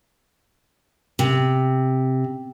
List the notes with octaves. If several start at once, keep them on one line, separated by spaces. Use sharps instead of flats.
C3